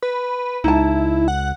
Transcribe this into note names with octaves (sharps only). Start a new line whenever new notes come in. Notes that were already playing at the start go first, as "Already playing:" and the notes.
B4
C#2 D#4 E4 A5
F#5